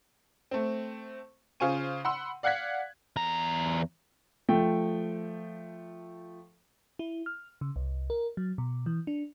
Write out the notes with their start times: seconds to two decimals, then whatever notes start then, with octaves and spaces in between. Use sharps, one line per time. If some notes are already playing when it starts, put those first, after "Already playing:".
0.51 A3 C4
1.60 C#3 F4 C5 G#5 C#6 D#7
2.05 F#5 B5 C6 E6
2.43 D5 F5 F#5 F#6 G#6 B6
3.16 E2 A#5
4.49 F3 A3 G5
6.99 E4
7.26 F6
7.61 C#3
7.76 C2
8.10 A#4
8.37 F#3
8.58 B2
8.86 E3
9.07 D4